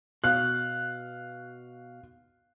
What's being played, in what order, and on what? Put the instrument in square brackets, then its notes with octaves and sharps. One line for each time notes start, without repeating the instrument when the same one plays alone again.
[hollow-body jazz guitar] B2 [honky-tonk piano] F5 F#6